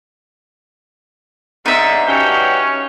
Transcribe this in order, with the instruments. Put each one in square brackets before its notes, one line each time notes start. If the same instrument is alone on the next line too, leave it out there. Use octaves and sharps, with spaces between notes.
[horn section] G#2 D3 [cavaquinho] D#4 E5
[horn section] G2 F#3 G5 [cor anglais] C#4